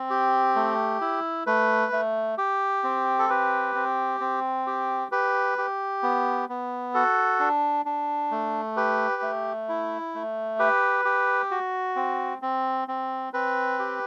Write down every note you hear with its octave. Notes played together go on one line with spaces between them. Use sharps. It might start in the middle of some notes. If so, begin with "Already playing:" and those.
Already playing: C4
G4
A3
E4
A3 B4
A3
G4
C4
A4
G4 B4
C4
C4
G4
G4 B4
G4
B3
B3
F#4 A4
D4
D4
A3
G4 B4
A3
E4
A3
G4 B4
G4
F#4
C4
C4
C4
C4 B4
G4